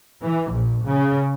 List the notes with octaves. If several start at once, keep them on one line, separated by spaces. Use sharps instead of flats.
E3
A#1
C#3